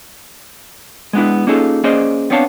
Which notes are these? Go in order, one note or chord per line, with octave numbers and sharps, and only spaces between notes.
G#3 B3 D4 E4
A#3 C#4 D#4 F4 G#4 A4
A#3 C#4 G#4 C5 D5 D#5
B3 C4 D4 C#5 F5 A5